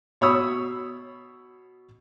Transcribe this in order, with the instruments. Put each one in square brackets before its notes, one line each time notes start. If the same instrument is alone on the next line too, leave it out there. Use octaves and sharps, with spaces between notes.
[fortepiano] B2 C#5 B5 D#6 E6